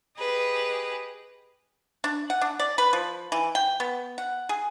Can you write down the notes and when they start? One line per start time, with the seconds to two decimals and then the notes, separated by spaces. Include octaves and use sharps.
0.17 G4 G#4 B4 D#5
2.04 D4
2.30 F#5
2.41 D4
2.59 D5
2.78 B4
2.93 F3
3.32 E3
3.55 G5
3.80 B3
4.18 F#5
4.49 G#4